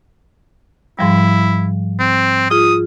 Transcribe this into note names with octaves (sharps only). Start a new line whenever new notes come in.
G#2 F3 G3 E4
C4
F4 G#4 D#6